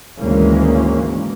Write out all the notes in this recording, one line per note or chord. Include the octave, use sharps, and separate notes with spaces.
G#1 D2 E3 G#3 A#3 C#4